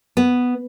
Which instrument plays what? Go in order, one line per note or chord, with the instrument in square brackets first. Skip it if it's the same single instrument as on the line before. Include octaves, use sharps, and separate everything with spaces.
[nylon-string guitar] B3